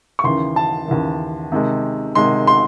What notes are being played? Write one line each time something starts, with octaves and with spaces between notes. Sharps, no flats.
C#6
D#2 C#3 E3 C6
A5
D#2 C#3 E3
C3 D#3 G#3
C3 D#3 G#3 C6
C6